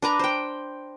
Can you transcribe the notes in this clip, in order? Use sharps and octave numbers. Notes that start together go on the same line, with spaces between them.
D4 B4 A#5
C5 G5